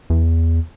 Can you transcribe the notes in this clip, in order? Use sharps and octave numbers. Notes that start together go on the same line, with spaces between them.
E2